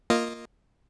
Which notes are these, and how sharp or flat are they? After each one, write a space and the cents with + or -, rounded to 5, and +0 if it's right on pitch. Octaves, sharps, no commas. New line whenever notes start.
A#3 +0 F4 +0 D#5 +0